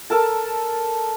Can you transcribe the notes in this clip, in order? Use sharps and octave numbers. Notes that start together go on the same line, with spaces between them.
A4 A#4 A5